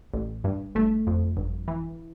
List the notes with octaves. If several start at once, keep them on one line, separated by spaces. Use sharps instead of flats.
A1
G2
G1 A3
F2
G1
E3